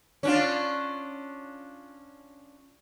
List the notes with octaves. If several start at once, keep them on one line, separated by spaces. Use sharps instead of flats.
C#4 D4 F4